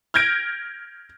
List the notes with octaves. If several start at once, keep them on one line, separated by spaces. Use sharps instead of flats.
F6 G6 G#6 A#6 D7